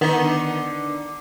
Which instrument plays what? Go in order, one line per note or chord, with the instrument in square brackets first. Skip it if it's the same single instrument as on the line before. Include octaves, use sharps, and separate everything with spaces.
[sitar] D3 D#4 [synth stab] D#3 B3